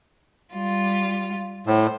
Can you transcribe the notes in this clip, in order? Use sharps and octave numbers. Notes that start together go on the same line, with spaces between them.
G3 F4
A2 C5